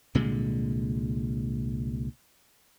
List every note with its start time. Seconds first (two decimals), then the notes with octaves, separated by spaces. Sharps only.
0.15 C2 A#2 D3 G#3